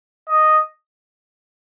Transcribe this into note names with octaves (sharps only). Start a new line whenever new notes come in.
D#5